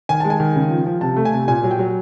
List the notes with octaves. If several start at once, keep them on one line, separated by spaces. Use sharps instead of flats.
D#3 G#5
G#3 A5
G#5
D#3
C#3
F3
F3
C3 A5
A3
G#5
C3
A#2 G#5
F#3
G5
F#3